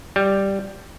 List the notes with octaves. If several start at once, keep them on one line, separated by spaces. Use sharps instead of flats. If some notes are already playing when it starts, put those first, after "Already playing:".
G3